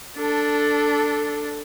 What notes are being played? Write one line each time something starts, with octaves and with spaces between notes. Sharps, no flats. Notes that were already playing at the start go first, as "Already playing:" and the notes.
D4 A4